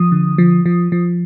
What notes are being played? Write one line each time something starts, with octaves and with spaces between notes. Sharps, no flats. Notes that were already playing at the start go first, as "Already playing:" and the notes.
Already playing: F3 D#6
D3
F3
F3
F3